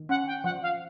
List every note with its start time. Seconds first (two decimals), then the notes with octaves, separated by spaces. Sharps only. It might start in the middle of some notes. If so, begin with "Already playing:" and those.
Already playing: D#3
0.09 C#4 F#5
0.27 G5
0.44 F3 F#5
0.62 F5